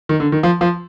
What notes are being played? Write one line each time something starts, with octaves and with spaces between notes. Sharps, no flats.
D#3
D3
D#3
F3
F3